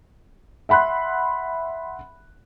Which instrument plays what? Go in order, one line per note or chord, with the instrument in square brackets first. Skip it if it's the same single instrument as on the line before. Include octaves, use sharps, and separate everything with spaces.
[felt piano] E5 F#5 B5 C6 F#6